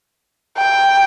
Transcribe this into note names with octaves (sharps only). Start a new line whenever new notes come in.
G5